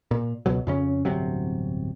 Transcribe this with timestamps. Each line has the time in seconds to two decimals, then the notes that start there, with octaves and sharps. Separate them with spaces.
0.11 A#2
0.46 C#2 B2 F#3
0.67 F2 C#3 C#4
1.05 D1 G1 C3 F#3